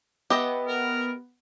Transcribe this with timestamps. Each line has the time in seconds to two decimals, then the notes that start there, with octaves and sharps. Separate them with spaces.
0.30 B3 G4 D#5 E5
0.68 A#4